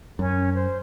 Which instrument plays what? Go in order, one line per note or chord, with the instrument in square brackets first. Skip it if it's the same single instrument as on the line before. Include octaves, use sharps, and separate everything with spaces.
[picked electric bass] F#2 [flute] C#4
[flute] C5